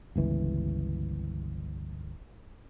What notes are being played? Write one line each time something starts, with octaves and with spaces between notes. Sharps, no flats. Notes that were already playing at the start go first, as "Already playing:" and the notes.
G1 C#2 E3